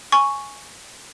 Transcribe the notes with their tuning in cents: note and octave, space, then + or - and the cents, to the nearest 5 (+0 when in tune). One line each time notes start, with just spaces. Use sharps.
G#5 +0 C#6 +0